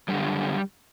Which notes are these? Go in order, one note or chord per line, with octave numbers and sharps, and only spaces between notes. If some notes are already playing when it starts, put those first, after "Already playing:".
F#2 D3 G3